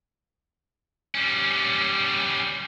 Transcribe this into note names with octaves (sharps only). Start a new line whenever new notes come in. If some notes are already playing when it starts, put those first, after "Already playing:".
G3 C#4